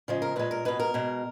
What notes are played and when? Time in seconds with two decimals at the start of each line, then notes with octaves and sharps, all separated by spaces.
0.08 C#3 F3 G#3
0.22 A#4
0.36 A#2 G#3 B4
0.51 A#4
0.65 B2 G#3 B4
0.80 A#4
0.94 B2 G#3